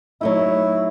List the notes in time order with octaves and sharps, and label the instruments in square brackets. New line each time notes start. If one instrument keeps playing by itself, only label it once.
[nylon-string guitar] F#3 A3 D#4 [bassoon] E4